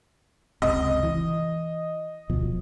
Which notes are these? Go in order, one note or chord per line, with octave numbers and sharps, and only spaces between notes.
F#1 C#2 C3 D#5
E3
D1 B2 F3